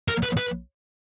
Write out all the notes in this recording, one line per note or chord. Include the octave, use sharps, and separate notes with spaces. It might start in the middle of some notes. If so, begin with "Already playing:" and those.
A#4
B4
B4